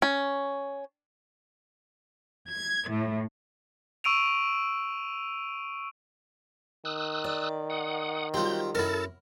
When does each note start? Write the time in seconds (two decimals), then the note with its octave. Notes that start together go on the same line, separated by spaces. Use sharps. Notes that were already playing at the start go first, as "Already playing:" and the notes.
0.02 C#4
2.52 G#6
2.87 A2
4.04 C#6 E6 D7 D#7 F7
6.85 D#3 D#6 E6 F#6
7.24 D5
7.70 F#5 D#6
8.34 F#3 G3 C4 F4 G6
8.75 F#2 E4 A4 A#4 A6